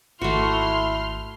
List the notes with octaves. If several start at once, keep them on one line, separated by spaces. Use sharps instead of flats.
G#1 A3 E4 F#4 C6 F6